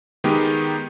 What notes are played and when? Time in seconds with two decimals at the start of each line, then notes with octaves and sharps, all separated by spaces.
0.24 D#3 G#3 B3 D#4 G4 A#4